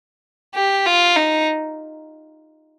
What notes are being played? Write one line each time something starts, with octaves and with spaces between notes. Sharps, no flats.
G4
F4
D#4